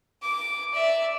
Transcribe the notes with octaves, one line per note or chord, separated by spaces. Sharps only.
D6
D5 E5